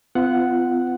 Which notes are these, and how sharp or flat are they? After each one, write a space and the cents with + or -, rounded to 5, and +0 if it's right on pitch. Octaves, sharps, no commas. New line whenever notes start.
B3 +45 F4 -20 F#5 +0